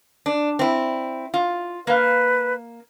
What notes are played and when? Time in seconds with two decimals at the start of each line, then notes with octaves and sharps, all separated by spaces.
0.26 D4
0.59 C4 E4
1.34 F4
1.87 A#3 B4 F5